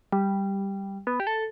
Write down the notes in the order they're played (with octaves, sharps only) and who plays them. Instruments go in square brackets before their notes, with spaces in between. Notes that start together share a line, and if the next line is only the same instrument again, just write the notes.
[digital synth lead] G3
B3
G4
A4